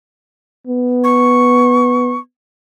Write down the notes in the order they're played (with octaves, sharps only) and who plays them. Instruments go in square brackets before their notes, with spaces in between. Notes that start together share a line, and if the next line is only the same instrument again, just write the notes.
[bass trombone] B3
[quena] C#6